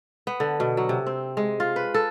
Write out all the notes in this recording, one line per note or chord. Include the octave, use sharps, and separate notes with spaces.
B3
D3
B2
F#3
C3
C4
G#3
F4
B4
A4